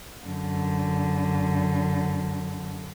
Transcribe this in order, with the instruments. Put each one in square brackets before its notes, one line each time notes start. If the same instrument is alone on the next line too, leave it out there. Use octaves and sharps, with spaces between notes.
[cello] F#2 D3